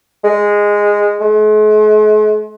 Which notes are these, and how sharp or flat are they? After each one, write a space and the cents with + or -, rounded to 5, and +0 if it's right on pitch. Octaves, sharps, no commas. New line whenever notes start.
G#3 -10
G#3 +45